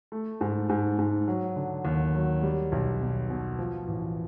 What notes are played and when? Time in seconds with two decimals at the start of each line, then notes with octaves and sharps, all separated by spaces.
0.12 A3
0.41 G#2
0.69 G#2
0.99 G#2
1.28 F#3
1.56 D3
1.85 D#2
2.15 F#3
2.42 G3
2.72 B1
3.01 B2
3.30 B2
3.59 F3
3.88 A1